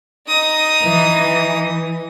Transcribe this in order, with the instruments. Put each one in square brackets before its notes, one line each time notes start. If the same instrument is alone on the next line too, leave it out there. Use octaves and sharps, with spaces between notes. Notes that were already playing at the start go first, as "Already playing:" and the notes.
[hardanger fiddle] D#4 D#6
[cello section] E3